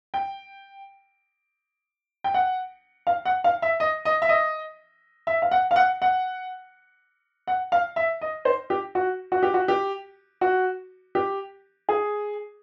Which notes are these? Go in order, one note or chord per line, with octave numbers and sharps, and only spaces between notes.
G5
G5
F#5
F5
F#5
F5
E5
D#5
D#5
E5
D#5
E5
F5
F#5
F5
F#5
F#5
F#5
F5
E5
D#5
C5
G4
F#4
F#4
G4
F#4
G4
F#4
G4
G#4